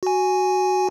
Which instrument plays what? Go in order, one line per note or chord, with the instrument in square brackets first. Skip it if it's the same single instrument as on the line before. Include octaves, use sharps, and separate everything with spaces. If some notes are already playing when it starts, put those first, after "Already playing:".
[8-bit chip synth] F#4 G#5